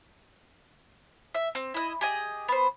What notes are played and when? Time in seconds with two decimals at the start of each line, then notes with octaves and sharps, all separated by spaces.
1.35 E5
1.55 C4
1.74 E4 D#5
2.01 G4 G#4 D#5
2.48 B3 C5